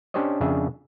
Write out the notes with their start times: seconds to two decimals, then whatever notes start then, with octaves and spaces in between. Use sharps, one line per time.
0.14 C#4 D4 G4 C5 C#5 D#5
0.41 F2 C#3 D4 G#4 E5